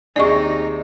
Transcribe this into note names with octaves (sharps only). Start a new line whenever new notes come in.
D#2 C3 D4 D#4 G#4 D5 D#5 C#6